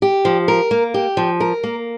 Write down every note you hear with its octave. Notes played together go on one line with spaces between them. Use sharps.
G4
F3
A#4
A#3
G4
F3
A#4
A#3